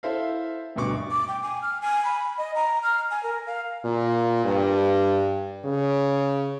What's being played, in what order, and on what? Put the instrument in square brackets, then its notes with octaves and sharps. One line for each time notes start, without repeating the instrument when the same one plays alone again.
[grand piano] E4 A4 C5 E5 F5
D2 G2 B2 C#6 D6
[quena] D6
G5
G#5
F6
G#5
B5
D#5
A#5
F6
G#5
A#4
F5
[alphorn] A#2
G2
C#3